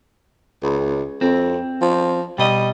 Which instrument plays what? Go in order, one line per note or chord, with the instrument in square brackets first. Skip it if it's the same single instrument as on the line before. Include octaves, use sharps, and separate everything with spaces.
[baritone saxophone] C#2
[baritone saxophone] F2 [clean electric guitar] C4
[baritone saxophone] F3
[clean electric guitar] B2 D#5 [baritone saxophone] G3